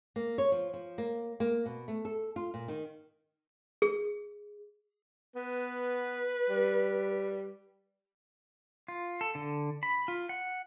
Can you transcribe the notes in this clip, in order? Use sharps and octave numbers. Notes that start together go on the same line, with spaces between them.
A#3
C#5
F3
F3
A#3
A#3
B2
A3
A4
F4
A#2
D#3
G#4
B3 B4
G3
F4
A4
D3
B5
F4
F#5